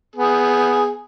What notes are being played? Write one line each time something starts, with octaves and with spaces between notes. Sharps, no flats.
B3 G#4